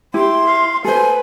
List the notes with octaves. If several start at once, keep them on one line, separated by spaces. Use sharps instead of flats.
E4 G4 C6
F5
A4 B4 C5 G#5